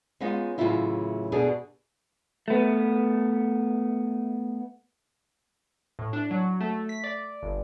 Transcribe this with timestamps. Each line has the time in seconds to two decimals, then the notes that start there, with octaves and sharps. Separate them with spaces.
0.20 G#3 B3 C#4 D#4 F4
0.58 A2 C#3 E3 F#3 E4 F4
1.32 D2 B2 D3 D4 G#4
2.48 A3 B3
5.99 A2
6.13 D4
6.31 F#3
6.60 A3
6.89 B6
7.04 D5
7.43 G1